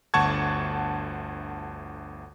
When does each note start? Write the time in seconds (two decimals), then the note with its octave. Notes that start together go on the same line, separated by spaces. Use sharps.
0.14 G1 D2 F#5 A5 C#6 G#6